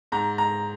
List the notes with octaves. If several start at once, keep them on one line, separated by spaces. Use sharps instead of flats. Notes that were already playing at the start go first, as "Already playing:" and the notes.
G#2 A#5
G#2 A#5